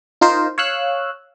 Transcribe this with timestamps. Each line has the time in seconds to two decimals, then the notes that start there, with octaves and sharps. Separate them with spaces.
0.21 D#4 F4 A#4 C5
0.58 C#5 F5 E6 F#6